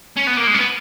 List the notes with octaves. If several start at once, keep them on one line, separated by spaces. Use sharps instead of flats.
C#4
B3
A#3
G#3
C#4
B3